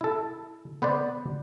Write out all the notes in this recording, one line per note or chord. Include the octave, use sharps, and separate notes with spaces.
E4 A4
B3 B4 C5 D5